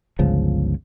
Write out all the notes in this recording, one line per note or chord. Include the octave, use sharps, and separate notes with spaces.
G1 C#2 C#3 F3